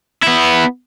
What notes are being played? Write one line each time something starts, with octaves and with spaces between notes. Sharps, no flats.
B3 E4